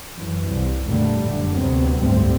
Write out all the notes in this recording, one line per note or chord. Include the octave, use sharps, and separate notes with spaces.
F#2 E3
C2
F1 A#2 D3 G3 A3
F#1 G#2 D3
D2 C3 F#3 B3 C4
F#1 D2 G#2 G3 A3 C4